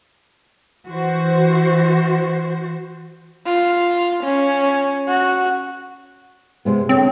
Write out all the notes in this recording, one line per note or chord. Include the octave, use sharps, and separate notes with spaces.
E3 F#4 C5
F4
C#4
F#4
C3 G#3 B3
D3 C4 C#5